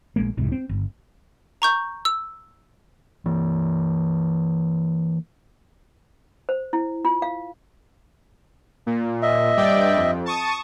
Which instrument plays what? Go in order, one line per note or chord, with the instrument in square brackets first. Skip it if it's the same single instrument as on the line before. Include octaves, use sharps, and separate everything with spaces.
[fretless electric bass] A#1 G#3 A#3
F1 C2 G#2 C3
C4
G1
[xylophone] A#5 C#6 G6
E6
[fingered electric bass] E3 A#3
[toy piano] C5
E4
F4
F5
[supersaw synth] A#2
[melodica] D#5 E5
[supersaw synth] G2 D5 G5
F2
A5 C#6 D#6